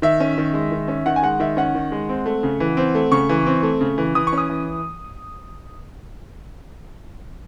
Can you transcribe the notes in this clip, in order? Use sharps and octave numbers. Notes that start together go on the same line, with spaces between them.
D#3 E5
C#4
D#3
G#3
D#3
C#4
D#3 F#5
G#5
G#3 F#5
D#3 E5
C#4 F#5
D#3
G#3
C4
A3
C#3
E3
C4
A3
C#3 C#6
E3
C4
A3
C#3
E3
E3 D#6
C#6
C#4 D#6
E3